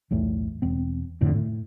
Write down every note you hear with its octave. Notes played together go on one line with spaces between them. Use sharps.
B1 E2 A2 A3
E1 C4
D1 F2 A2 D3
A2